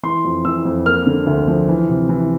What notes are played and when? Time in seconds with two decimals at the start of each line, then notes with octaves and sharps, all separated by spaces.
0.03 E3 C6
0.25 F2
0.45 E3 E6
0.65 F2
0.86 A#3 F6
1.07 D3
1.27 D2
1.48 F3
1.68 E3
1.89 C3
2.09 E3